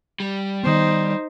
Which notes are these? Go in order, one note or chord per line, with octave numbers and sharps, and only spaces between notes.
G3
D#3 B3 D#4 C5